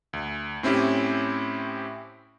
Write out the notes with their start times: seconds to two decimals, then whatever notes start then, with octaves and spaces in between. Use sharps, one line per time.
0.13 D2
0.63 A2 C4 C#4 E4 G4